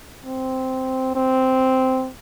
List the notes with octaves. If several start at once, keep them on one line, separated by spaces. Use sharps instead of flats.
C4
C4